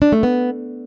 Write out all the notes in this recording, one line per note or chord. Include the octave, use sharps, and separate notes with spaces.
D4
A3
B3